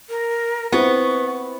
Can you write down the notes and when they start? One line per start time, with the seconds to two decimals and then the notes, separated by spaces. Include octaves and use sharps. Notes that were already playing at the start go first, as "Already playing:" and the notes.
0.09 A#4
0.72 B3 C4 E4 C#6